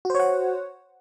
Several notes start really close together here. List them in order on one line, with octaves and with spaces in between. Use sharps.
F#4 C5 C#5 F#5